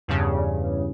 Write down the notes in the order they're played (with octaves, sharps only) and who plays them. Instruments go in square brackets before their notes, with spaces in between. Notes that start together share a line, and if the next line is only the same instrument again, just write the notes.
[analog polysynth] E2 G2 C#3